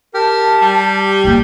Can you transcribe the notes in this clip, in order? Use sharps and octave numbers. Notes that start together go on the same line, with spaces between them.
G4 A#4 A5
G3
A#1 A#3